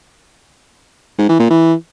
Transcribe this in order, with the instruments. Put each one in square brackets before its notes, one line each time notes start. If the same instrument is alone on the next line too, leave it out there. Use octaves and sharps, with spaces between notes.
[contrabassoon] G#2
E3
A#2
E3